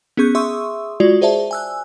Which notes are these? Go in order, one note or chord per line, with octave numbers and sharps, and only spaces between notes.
B3 C#4 G#4 C#6 G6
G#4 E5 C6 C#6 D#6 E6
G#3 F4 F#4 D5
G#4 C5 D5 E5 A5
G#5 E6 F#6